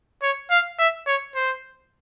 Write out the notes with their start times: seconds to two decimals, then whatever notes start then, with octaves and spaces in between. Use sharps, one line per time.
0.23 C#5
0.51 F5
0.79 E5
1.07 C#5
1.35 C5